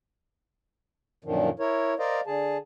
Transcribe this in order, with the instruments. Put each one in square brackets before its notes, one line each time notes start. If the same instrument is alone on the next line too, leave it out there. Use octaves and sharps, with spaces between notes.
[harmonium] F#2 A#2 D3 D#3 F3
E4 A#4 C#5
A#4 C5 D5 D#5 F5
D3 G#4 A5